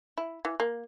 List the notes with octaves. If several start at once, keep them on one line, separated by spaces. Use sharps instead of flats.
E4
E3
A#3